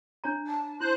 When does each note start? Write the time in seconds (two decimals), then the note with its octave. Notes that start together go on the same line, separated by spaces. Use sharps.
0.24 D4 C#5 A#5
0.47 A5
0.81 E4 C5 F#6